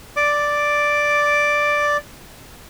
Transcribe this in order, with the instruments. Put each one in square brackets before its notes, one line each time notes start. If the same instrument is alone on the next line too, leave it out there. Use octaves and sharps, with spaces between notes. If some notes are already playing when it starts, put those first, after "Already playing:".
[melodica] D5 D6